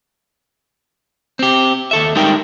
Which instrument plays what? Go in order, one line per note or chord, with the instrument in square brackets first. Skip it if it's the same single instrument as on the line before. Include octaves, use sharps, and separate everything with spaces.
[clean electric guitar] C4 G4
D#2 A4 E5
G3 G#3 D#4 A#4 G5